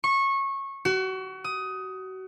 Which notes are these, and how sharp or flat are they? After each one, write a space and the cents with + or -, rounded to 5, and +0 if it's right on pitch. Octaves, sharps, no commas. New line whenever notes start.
C#6 -20
F#4 +30
D#6 +15